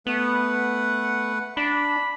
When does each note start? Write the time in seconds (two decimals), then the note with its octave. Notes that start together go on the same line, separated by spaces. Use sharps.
0.07 A3 B3 B4 F#5
1.57 D4 B5